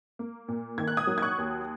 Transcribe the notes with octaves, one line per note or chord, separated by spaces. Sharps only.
A#3
A#2
D#3 G#6
F#6
D#6 G#6
F#3
G#6
C#6 F#6
D#2